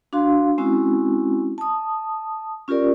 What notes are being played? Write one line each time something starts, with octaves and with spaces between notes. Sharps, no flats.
D4 F#4 F5 C6
G#3 C4 C#4 E4 F#4
A5 D#6
C#4 F4 G4 A#4 D5